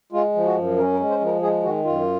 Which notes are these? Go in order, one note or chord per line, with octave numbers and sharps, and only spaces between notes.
G#3 F4
F3
F#4
F#2
C#4 A#4
A#4
G#3
C5
F3
A#4
G#3 G#4
D#3 F#4
F#2 F4